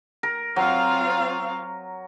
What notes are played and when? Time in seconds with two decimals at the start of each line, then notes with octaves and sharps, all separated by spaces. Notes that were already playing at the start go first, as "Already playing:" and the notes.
0.23 A#4
0.56 F#3 C4 F4 F5